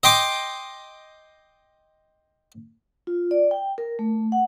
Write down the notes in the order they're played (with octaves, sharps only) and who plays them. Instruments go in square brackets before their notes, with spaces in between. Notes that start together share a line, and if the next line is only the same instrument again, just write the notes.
[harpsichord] D#5 G5 C6 D6
[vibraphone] F4
D5
G5
A#4
A3
F#5